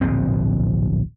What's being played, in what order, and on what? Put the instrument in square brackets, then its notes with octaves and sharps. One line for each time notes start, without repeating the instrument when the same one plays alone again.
[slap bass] D1 A#1 B2 C4